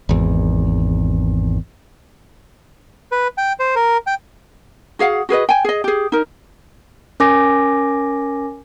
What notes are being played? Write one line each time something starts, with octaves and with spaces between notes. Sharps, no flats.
G#1 E2
B4
G5
C5
A#4
G5
F#4 G#4 F5 F#5
F#4 G#4 B4 D#5
G5 G#5
G#4 D#5
G4 G#4
D#4 A#4
C#4 A#4 G#5 D6 A#6